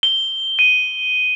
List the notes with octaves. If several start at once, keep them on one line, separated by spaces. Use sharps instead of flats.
G7
D#7